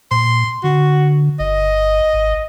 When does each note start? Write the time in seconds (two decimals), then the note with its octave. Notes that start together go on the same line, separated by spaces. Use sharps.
0.11 A#2 C6
0.64 D3 F#4
1.40 G1 D#5
2.13 G#1